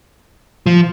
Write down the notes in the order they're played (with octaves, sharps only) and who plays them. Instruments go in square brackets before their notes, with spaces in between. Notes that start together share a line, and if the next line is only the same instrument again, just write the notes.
[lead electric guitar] F3